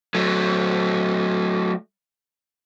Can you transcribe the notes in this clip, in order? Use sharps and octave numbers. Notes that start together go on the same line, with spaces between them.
F#3 A3